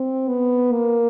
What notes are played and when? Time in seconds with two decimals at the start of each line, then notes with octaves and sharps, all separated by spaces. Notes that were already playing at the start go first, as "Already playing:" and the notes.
Already playing: C4
0.28 B3
0.72 A#3